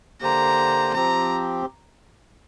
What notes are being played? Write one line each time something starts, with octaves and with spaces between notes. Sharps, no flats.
D3 A#3 G4 C5 A#5
F3 C4 G4 A#5